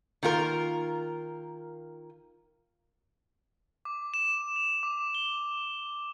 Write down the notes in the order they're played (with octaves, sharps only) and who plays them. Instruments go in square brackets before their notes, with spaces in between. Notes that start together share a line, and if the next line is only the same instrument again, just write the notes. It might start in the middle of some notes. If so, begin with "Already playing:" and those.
[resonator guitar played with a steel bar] D#3 A#3 F4 A#4
[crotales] D6
E7
F7
D6
G7